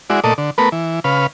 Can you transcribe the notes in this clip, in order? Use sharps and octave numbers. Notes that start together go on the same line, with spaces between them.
G#3 E4 F#4 D5
A#2 A3 A4 D5 D#5
D3
A3 B3 A#4 B4
E3
C#3 B4 F5